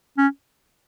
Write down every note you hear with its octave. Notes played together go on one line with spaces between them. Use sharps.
C#4